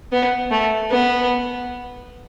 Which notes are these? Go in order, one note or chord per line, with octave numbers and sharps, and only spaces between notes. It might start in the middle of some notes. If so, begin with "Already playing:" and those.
B3
A3
B3